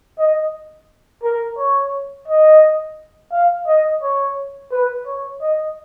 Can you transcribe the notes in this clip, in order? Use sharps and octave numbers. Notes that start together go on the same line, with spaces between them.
D#5
A#4
C#5
D#5
F5
D#5
C#5
B4
C#5
D#5